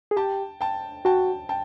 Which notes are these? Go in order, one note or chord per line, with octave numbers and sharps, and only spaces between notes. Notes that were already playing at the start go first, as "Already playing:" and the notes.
G#4
G4 G5 A5
G5 A5
F#4 G5 A5
G5 A5